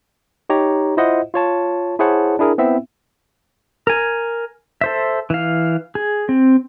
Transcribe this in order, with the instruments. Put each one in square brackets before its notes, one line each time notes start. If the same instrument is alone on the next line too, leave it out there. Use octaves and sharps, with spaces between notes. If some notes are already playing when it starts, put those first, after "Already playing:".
[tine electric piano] D#4 G4 C#5 A#5
E4 F4 C5 D#5 E5 F#5
F4 C#5 A5
E4 G#4 C5 C#5 F#5 A5
D4 E4 G#4 A#4
B3 C4 E4 E5
[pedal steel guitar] A#4 G#5
A4 C5 E5
E3 F5
G#4
C4